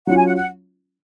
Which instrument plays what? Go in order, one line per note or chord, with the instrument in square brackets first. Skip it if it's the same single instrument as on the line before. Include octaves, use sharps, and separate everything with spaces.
[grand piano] F#3 C#4 F4 [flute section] F#5
[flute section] G#5
F#5
F#5